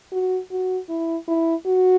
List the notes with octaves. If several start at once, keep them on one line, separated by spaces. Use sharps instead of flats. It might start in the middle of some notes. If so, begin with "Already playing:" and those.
F#4
F#4
E4
E4
F#4